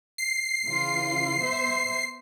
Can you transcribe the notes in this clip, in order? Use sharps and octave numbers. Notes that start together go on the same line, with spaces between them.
C7
C#3 E3 F4
B3 C5 E5